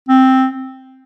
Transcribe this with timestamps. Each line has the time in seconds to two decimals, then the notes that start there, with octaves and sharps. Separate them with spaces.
0.09 C4